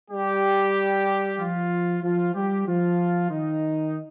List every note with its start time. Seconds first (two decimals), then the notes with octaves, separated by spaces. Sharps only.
0.10 G3 G4
1.38 F3 F4
2.03 F3 F4
2.35 G3 G4
2.67 F3 F4
3.30 D#3 D#4